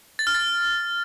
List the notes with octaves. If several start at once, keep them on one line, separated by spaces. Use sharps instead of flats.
A6
F6
A6